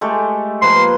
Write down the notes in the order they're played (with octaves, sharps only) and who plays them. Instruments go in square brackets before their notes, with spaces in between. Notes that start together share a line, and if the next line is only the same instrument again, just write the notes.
[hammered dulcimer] G#3 A3 G4
[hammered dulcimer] F3 A#3 B4 [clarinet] C6